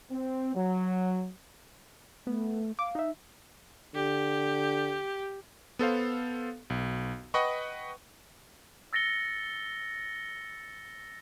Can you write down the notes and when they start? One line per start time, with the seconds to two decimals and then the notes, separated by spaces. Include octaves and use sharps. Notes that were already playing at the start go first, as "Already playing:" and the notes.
0.12 C4
0.55 F#3
2.27 A3 B3
2.79 F5 D6
2.95 D#4 E5
3.95 D3 G4
5.79 B3 A4 C5 F5
6.70 B1
7.34 B4 D#5 F#5 G5 B5 C#6
8.93 E6 A6 A#6 C#7 G7